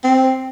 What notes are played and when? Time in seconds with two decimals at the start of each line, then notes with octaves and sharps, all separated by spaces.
0.04 C4